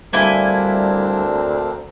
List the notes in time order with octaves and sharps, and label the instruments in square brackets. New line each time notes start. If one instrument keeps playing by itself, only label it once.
[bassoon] D2 [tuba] G3 [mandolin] A#3 E4 G#5 [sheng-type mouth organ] C4 D4 A#4